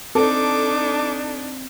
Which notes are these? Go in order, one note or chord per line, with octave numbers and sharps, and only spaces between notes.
C4 D4 D#4 A4 D6